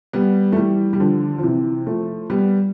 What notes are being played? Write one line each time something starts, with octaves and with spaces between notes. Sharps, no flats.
G3 B3
A3
E3 G3
G3
D3 F3
F3
C3 E3
F3 A3
G3 B3